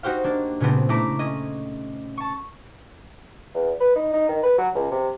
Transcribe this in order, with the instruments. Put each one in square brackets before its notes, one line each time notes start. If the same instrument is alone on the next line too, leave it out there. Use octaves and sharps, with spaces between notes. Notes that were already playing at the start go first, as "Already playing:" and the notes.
[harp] D#4 F#4 G4 C5 F5
A#3 D4
A#2 C#3 A3 B3 C4 D4
A3 E4 A#5 D6
C#4 D#5
A5 C#6
[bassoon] E2
B4
D#4
D#4
D#3
B4
F#3
C#2
C3